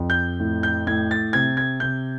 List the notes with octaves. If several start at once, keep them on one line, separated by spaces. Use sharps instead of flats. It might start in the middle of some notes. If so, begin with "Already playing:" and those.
Already playing: F2
G6
A2
G6
A2 G#6
A6
C3 G#6
G#6
C3 G6